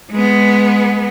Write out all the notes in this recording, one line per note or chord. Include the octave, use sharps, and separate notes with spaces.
G#3 B3